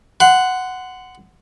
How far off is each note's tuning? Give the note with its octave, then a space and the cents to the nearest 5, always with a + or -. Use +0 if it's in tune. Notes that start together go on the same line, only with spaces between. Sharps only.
F#5 +0 C6 -30